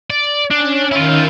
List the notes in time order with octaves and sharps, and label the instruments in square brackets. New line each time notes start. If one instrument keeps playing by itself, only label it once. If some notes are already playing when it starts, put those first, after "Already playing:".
[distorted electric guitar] D5
[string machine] C#4 [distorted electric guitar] D4
[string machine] D#3 G6 [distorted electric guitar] E4 F4